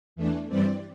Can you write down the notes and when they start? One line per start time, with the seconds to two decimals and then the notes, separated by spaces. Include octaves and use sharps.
0.16 E2 E3 A3 D4
0.48 G2 E3 G3 C4 D5